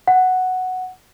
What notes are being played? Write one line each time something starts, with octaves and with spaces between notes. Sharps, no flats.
F#5